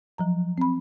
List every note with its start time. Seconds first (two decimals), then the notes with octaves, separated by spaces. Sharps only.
0.18 F3 F#3 A#5
0.58 C4 B5